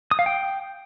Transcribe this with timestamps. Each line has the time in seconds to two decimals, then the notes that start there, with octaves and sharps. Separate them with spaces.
0.11 D#6
0.19 F5
0.26 G5